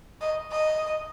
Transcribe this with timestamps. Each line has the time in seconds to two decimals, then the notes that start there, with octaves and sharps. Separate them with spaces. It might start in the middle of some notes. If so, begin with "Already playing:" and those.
0.21 D#5
0.52 D#5